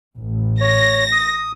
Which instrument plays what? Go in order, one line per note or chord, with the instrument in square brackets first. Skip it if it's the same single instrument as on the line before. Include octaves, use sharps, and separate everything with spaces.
[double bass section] A1
[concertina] C#5 [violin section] A#6
[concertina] D#6